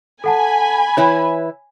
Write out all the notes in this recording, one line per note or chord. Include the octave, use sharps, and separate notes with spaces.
A4 F#5 G#5 A5 B5
E3 E4 B4 C#5